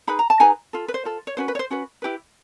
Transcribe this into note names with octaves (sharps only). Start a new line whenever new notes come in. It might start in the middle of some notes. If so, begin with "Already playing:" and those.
D#4 G#4 B4 B5
A#5
A5
D#4 G#4 B4 G#5 A#5
F4 A4
B4
C5
F4 A4
C#5
C#4 F#4 B4 C5
B4
C#5
C5
C#4 F#4 B4
E4 G4 B4